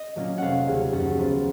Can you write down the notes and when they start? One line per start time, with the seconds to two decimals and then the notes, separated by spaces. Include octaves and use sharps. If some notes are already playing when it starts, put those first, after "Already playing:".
Already playing: D#5
0.16 A#2 F#3 A#3 C#4
0.38 F1 F5 F#5
0.67 D#2 C#3
0.93 F#2 F#5
1.18 F3 B3